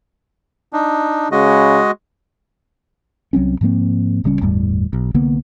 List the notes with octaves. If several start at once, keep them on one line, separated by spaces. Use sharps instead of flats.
D4 D#4
C#3 G#3 F#4 D#5
C2 F#3 C4 C#4
G#2 F3 A#3 C4
D1 C#3 G3 C#4
G1 E2 A2 G3
B1
C2 D3 A#3 B3